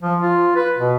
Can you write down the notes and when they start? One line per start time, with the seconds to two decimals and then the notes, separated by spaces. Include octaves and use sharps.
0.02 F3
0.21 F4
0.56 B4
0.77 B2